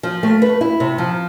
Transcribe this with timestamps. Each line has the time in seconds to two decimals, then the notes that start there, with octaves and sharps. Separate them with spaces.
0.03 F3
0.23 A3
0.42 B4
0.61 E4
0.80 C3
0.98 F3